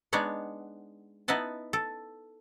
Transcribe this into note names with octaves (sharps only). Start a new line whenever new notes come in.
G#3 B3 D4 D#4 C#5 F#5
B3 D#4 E4 D#5 F#5 A5
A4